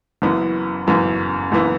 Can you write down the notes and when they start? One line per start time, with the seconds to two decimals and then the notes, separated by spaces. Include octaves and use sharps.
0.22 F#1 F#2 E3 B3 E4
0.87 F#1 F#2 E3 B3 E4
1.52 F#1 F#2 E3 B3 E4